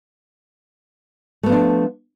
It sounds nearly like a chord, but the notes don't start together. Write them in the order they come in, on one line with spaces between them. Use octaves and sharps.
A3 B3 F3 D4